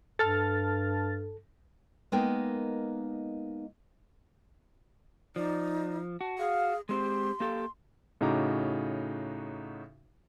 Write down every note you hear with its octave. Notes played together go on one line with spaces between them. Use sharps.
G2 A4 A5 F6 A6
G#3 A#3 B3 D#4 A#4 G5
F3 D#4 D5
F#4 A5
G#4 F5
G#3 C4 G4 C5 C6
A#3 G4 A4 F5
A2 C#3 D#4 F#4 A#5 D6